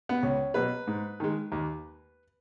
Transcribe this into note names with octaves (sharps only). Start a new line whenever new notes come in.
B3
C#2 C#4
B2 F#3 B4
G#2
D#3 G#3
D#2